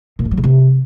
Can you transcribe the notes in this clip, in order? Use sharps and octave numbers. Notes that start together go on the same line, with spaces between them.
A#2
G#2
F#3
C#3
C3